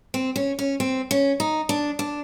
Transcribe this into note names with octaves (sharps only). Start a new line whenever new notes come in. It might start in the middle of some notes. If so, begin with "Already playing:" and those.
C4
C#4
C#4
C4
C#4
D#4
D4
D4